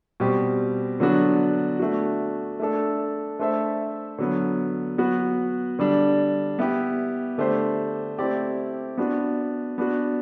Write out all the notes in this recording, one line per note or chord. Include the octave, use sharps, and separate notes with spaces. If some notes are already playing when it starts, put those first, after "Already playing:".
B2 G3 C4 G4
D3 F#3 B3 D4 F#4
A3 D4 F#4
A3 D4 A4
A3 D4 A4 C5 E5
D3 F#3 B3
F#3 B3 F#4
D3 G3 D4
B3 E4 G4
D3 A3 D4 G4 C5
A3 C4 E4 G4 D5
B3 D4 F#4
B3 D4 F#4